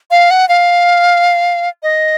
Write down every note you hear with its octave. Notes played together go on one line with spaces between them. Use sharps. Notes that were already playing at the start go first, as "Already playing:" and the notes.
F5
F#5
F5
D#5